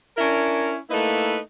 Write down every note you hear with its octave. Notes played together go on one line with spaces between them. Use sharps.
C#4 D4 E4 A#4
A3 A#3 D#4 E4 B4